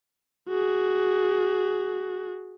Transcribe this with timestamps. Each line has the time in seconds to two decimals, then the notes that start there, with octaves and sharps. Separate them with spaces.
0.49 F#4 G#4